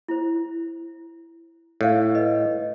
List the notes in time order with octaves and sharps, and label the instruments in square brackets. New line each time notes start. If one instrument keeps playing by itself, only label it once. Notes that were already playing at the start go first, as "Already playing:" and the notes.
[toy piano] E4 C5
[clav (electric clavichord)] A2 [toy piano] C#5 F5
[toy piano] B4 D#5